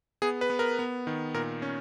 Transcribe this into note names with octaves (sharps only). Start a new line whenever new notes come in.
B3 G#4
B4
B3
A#4
B3
D#3
A#2 A#4
C#4